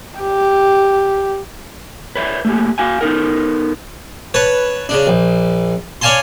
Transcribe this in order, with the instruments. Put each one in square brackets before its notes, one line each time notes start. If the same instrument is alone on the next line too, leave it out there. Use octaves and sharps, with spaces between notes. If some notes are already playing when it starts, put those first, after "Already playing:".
[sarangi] G4
[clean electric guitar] B4 C#5 D5 E5
A3 A#3 G4
F#4 F5 G#5
B3 D#4 A4 A#4
[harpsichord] B4 C#5 A5
C#3 D4
A#1
C#5 D5 F5 G#5 A5 C6